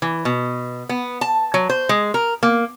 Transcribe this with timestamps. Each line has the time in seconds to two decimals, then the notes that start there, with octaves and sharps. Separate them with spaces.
0.02 E3
0.25 B2
0.89 B3
1.21 A5
1.54 F#3
1.70 C5
1.89 G#3
2.14 A#4
2.43 A#3